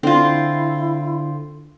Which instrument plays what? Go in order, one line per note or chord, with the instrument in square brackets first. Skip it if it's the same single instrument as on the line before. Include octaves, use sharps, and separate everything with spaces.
[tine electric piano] D3 [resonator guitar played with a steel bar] C4 F4 [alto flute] E4